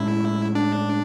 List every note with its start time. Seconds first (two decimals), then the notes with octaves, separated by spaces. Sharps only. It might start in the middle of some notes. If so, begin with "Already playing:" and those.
Already playing: A2 G#3 C#4 E4
0.55 D4